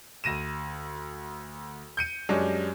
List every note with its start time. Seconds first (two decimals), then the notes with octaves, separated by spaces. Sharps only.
0.24 D2 A#6 D#7 E7
1.97 G6 C#7 D#7
2.29 F#2 G3 G#3 C#4 D4